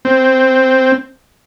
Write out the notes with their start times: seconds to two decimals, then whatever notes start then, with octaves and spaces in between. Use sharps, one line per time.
0.05 C4